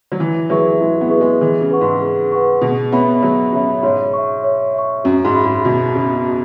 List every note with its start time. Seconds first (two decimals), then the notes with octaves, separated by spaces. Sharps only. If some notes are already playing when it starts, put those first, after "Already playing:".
0.12 F#3
0.19 E3 E4
0.50 F#3 G#4 B4 E5 C#6
0.80 G#3 E4
1.01 B3
1.10 G#4 B4 E5 C#6
1.21 G#3
1.41 E3 G#4
1.61 C#3
1.71 B4 F#5 C#6
1.81 G#2
2.01 G#4
2.32 B4 F#5 C#6
2.62 B2 G#4
2.92 B3 C#5 E5 B5
3.23 F#3 G#4
3.53 C#3 C#5 E5 B5
3.83 G#2 C#5
4.14 E5 C#6
4.44 C#5
4.74 E5 C#6
5.04 F#2 F#4
5.25 G#2
5.35 E5 B5
5.46 G#2
5.65 B2 F#4
5.95 C#3 E5 B5
6.26 F#4